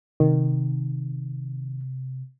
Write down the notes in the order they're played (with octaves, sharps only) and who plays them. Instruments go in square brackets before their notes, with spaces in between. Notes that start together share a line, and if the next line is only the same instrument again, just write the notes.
[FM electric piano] C3 [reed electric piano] D#3